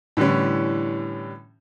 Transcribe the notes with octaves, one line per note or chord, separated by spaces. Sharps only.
A2 D3 E3 G3 C#4